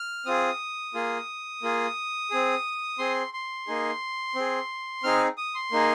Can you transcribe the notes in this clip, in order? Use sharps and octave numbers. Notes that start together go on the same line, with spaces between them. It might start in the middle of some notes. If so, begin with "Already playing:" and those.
Already playing: F6
C4 F4 G#4 D#6
A#3 F4 G#4
A#3 F4 G#4
C4 G#4
C4 G#4 C6
C6
A#3 D#4 G#4
C4 G#4
C4 D#4 G#4 F6
D#6
C6
A#3 D#4 G#4